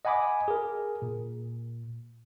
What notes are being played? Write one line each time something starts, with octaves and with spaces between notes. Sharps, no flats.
D#5 F#5 G#5 B5 D6 D#6
G#4 A#4
A#2